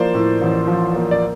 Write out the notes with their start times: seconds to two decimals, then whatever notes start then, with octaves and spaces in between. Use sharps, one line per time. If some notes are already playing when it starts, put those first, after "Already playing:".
Already playing: F3 A#3 C5 D5
0.15 A2
0.42 A1
0.67 F3
0.95 A#3
1.11 D5